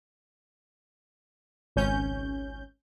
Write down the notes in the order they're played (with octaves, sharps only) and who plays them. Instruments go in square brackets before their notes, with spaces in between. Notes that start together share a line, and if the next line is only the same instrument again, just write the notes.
[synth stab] G#1 C#2 C#4 G6